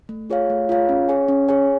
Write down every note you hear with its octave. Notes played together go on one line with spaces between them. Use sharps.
A3
F4 G#4 C#5 F5
A3
F4 G#4 C#5 F5
C#4
G#4 C#5 G#5
C#4
G#4 C#5 G#5